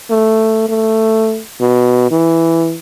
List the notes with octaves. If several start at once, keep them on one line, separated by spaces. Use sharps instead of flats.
A3
A3
B2
E3